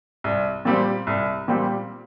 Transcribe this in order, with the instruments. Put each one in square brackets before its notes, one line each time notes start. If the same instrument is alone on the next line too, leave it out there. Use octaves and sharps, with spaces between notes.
[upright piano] C2
A#2 G3 C4 G4
C2
A#2 G3 C4 G4